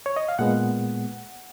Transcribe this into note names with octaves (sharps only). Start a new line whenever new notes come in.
C#5
D#5
F5
A#2 G#3 B3 F#5